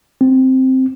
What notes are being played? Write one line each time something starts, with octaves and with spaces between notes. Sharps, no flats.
C4